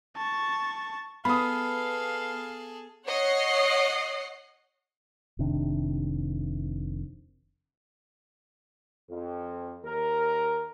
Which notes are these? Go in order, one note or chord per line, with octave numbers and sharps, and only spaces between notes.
A5 C#6
B3 G#4 A4 F5 B5 D#6
C#5 D#5 F#5 C7
F1 C3 D#3 D4
F2
D#2 A#4